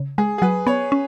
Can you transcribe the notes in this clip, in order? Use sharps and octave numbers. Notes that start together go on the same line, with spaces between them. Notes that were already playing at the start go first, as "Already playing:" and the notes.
Already playing: C#3
G#3 G#4
G#4
F#3 B4
B3 C#5
C#4